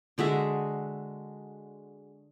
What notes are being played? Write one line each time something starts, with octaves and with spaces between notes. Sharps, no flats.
D3 G#3 F#4 E5